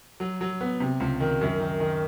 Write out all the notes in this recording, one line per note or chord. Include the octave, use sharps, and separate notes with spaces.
F#3
F#3
B3
C3
C#2
D#3
F#2
D#3
D#3